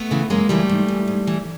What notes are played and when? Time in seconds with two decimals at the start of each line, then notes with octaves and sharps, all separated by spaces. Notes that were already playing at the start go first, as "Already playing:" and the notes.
Already playing: A3 B3
0.11 C#3 E3
0.30 F#2 G#3 A#3
0.49 C#3 E3 G3 A3
0.70 G#2
0.88 E3
1.08 G#2
1.27 E3